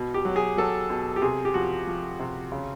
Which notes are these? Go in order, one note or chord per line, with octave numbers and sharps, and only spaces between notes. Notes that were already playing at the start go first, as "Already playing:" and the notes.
Already playing: B2
G4
F#3
G#4
F#3 A4
B2
G4
C3 G#4
G4
F3 F#4
F3
C3
C#3